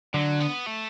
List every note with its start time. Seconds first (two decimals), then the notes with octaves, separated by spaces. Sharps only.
0.14 D3 F#3
0.40 B3
0.66 A3